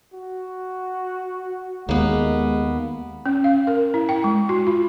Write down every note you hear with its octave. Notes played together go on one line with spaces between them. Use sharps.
F#4
D#2 G#3 A#3 B3
C#4
F5
A#4
E4
G5
G#3
F#4
F4